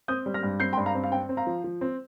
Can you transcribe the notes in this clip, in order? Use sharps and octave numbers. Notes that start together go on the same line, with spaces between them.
C4 D#6 G6
G3
F6 A#6
G2
C4 G6 C7
G5 C6
G2
F5 A#5
C4
F5
C4 G5
C4
F5 A#5
F3
F3
C4